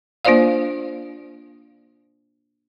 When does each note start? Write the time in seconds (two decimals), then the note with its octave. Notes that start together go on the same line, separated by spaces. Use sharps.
0.25 A#3 D4 F4 C5 D5 F5